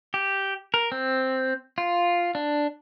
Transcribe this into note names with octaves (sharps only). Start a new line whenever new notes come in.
G4
A#4
C4
F4
D4